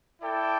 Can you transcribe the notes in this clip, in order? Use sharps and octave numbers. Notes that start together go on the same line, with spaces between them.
E4 A4 D5 G5